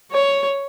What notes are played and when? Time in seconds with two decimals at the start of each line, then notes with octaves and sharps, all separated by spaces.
0.11 C#5